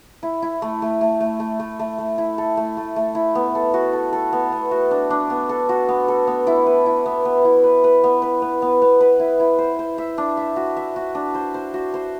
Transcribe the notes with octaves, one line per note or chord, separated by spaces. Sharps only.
E4
E4
A3
A3
A3
A3
A3
A3
A3
A3
E4
A4
A3
A3
A3
E4
B3
A4
F#4
A4
A4
B3
B3
F#4
D4
D4
B3
A4
F#4
B3
A4
B3
E4
B4
E4
B3
B3
E4
B4
B4
B3
B4
B3
B3
B3
B4
E4
E4
C5
C5
E5
D4
E5
F#4
E5
F#4
D4
C5
C5
F#4
C5